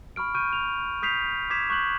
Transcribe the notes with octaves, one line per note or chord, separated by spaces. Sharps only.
B5 C#6 F6 D7
C#6 F6 G6 D7 D#7
F7
D#6 G6 B6 C7 F7
D6 G#6 B6 E7
C#6 F#6 G6 F#7